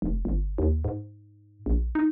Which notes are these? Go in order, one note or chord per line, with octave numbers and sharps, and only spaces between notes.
F1
G1
D#2
G#2
A#1
D#4